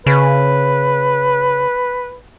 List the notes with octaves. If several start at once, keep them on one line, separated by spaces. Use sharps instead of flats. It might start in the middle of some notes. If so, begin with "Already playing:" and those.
C#3 B4